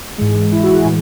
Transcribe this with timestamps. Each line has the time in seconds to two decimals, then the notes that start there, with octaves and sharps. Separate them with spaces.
0.18 G#2 E3 G#3
0.52 E4
0.63 F#4
0.74 G#4
0.85 A2 E3 G#3